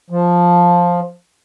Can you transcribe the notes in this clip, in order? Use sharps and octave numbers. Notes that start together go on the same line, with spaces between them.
F3